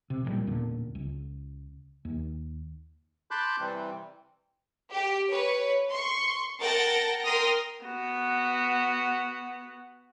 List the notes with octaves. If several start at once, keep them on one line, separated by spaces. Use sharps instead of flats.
C3
A1 G2 A#2 G3
A1 E2 A#2 D3
C#2
D#2
A5 B5 C6 D6 F#6 G6
C3 E3 G3 C4
G4
B4 C#5
C6 C#6
A#4 F#5 G5 A5 A6 A#6
A#4 G5 C6 D#6 F6 A#6
B3 F#4